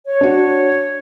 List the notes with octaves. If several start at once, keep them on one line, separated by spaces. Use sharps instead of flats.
C#5
D4 F#4